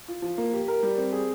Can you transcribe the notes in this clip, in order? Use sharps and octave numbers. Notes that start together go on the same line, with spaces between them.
F4
F3
A#3
G4
A#4
G3
C4
G#4